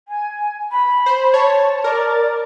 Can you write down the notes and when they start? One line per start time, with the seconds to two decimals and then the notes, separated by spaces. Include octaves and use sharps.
0.08 G#5
0.72 B5
1.06 C5
1.34 C#5 A5
1.84 A#4 D5